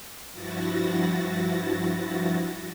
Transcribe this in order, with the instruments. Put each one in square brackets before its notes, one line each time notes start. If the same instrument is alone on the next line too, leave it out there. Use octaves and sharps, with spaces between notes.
[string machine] G2 F3 E4 F#4 A6 A#6